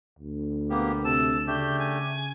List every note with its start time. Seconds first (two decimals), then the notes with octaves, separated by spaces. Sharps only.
0.19 D2
0.70 B2 A#3 B3 G4
1.05 C3 A4 A5 E7
1.47 C#3 A3 D4 G4 G6
1.79 G#5